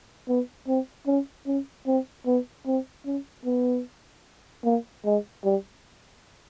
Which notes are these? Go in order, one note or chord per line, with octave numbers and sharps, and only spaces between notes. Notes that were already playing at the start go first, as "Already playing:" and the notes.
B3
C4
C#4
C#4
C4
B3
C4
C#4
B3
A#3
G#3
G3